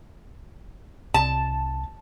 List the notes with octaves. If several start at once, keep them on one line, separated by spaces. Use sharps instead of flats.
C2 C3 A5